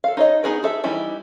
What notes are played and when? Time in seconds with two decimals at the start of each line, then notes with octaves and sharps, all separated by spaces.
0.04 A4 F5
0.17 D#4 C#5 D#5
0.43 B3 D#4 G#4 A#4 B4
0.63 G#4 A4 E5
0.84 E3 G3 D#4 E4